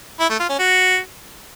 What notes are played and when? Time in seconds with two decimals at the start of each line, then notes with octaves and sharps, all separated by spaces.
0.20 E4
0.30 A3
0.39 F4
0.49 C#4
0.59 F#4